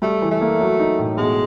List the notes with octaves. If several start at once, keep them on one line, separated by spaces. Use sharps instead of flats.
G3 A3
E3
A3
A#3
F#3
D#4
A2
B2 G#3